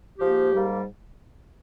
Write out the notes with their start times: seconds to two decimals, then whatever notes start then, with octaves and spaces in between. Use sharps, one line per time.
0.18 G#2 F3 A#3 G4
0.51 G#2 G3 A#3